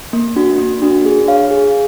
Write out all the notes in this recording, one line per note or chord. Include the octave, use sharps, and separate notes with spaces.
A#3
D4 F#4
A#3
D4 F#4
G#4
C#5 F5
G#4